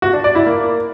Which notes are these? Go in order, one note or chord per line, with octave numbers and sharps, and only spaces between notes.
F#4
D4
D5
E4
A#3